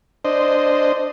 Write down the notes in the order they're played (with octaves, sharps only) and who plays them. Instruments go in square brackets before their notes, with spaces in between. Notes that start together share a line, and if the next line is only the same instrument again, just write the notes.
[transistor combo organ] D4 C5 D#5